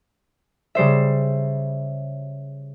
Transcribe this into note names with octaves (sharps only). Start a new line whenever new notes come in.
C#3 G3 C5 E5